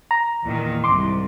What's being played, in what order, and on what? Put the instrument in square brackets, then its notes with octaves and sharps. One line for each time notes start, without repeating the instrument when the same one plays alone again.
[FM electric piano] A#5
[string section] E2 A#2 D#3
[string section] C2 G#2 [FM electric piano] C6 D6